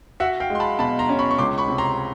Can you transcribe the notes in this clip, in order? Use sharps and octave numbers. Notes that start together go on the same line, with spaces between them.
F#4 E5 F#5
F5 G5
G#3 C6
A5 B5
B2 A5 B5
A#5 C6
C#4
B5 C#6
C#6
C#2 C6 D6
B5 C#6
C3
A#5 C6